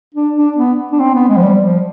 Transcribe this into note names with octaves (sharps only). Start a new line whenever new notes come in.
D4
D4
B3
D4
C4
B3
G#3
F3
G3
F3